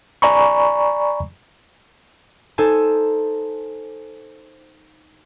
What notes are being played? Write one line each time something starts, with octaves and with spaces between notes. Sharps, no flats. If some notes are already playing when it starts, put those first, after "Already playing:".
D5 G#5 A#5 B5 C#6
D#4 A4 C5 G#5 A5